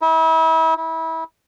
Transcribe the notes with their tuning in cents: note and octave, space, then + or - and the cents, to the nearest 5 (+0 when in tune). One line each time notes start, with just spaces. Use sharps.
E4 -35
E4 -30